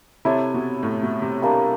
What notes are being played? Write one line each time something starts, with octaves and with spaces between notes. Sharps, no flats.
C3 E4 A4 C#5 E5
B2
A2
B2
C3
G3 A#3 D4